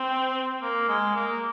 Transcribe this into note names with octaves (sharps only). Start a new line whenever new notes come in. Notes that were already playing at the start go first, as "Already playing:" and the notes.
Already playing: C4
A#3
G#3
A#3